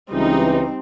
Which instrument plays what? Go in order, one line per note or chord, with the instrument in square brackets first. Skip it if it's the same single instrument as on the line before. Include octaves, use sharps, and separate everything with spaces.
[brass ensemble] C#2 E3 [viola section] G3 D#4 [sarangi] C4